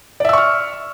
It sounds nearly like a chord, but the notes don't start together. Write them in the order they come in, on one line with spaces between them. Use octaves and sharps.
D5 E5 E6 C#6 F6